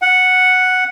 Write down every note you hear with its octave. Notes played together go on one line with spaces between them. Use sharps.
F#5